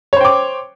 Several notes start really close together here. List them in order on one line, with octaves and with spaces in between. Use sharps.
C#5 C5 G5 D6